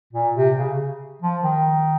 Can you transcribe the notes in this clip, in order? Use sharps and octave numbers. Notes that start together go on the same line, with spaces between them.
A#2
C3
C#3
F3
D#3